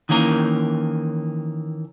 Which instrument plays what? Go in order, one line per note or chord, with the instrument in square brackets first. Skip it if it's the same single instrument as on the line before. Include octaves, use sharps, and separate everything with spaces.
[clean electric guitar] D#3 E3 A#3 C#4 A#4